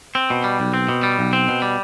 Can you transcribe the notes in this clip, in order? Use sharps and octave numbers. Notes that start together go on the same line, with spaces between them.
C4
B2
G3
B1
C4
B2
G3
B1
C4
B2
G3